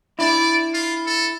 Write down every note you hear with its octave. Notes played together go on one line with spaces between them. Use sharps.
D4 E4 D5
F4
A4